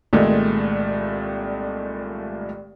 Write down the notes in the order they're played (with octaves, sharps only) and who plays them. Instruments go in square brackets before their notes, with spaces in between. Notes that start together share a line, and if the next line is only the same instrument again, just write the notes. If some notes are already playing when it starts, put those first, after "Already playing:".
[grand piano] C2 A#2 D#3 G#3 A3